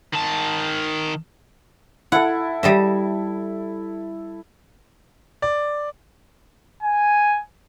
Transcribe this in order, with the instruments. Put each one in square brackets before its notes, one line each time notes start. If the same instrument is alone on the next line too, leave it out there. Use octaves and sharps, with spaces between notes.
[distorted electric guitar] D#3 A5
[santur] E4 A4 [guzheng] F#5
[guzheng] G3 D#5 E5
[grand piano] D5
[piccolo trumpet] G#5